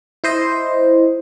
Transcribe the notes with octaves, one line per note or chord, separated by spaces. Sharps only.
E4 C5 D#5